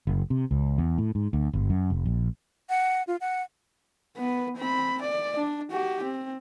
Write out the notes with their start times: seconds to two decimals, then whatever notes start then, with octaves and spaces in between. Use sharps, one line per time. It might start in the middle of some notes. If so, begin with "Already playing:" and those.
0.07 F#1
0.30 C3
0.51 C#2
0.78 E2
0.98 A2
1.15 G#2
1.33 D2
1.53 G1
1.70 F#2
1.90 F1
2.05 A#1
2.69 F#5
3.07 F4
3.21 F#5
4.17 B3 B4
4.56 C4 B5
5.01 D5
5.37 D4
5.71 F#4 G4
6.03 C4